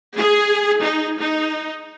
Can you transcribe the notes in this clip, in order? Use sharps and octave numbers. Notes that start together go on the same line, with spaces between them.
G#4
D#4
D#4